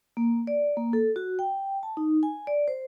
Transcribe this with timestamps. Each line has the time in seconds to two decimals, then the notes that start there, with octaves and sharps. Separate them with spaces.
0.17 A#3
0.47 D5
0.77 A#3
0.93 A4
1.16 F#4
1.39 G5
1.83 A5
1.97 D#4
2.23 G#5
2.47 D5
2.68 C5